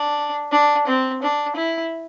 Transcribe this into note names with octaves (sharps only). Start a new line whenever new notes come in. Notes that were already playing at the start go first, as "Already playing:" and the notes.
Already playing: D4
D4
C4
D4
E4